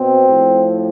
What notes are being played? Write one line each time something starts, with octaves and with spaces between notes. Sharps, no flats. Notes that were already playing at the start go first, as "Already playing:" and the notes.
Already playing: B2 C4
A2 F3